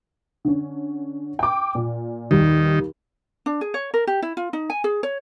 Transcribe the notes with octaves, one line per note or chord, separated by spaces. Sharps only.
D3 C#4
G5 D6
A#2
D#2 D#3 G3
D4
G#4
C#5
A#4
G4
E4
F4
D#4
G#5
G#4
C#5